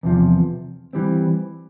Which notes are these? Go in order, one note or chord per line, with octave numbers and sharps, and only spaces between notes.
E2 C3 F3
E3 G3 C4